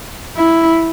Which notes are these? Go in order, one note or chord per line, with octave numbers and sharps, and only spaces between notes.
E4